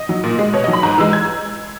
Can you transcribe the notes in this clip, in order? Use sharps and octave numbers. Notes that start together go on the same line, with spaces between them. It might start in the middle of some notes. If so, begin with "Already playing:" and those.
Already playing: D#5
F#3
A#2
G#3
B2 C#5
F#3 D#5
B5
G#2 A#5
E3 G#3 E6
G#6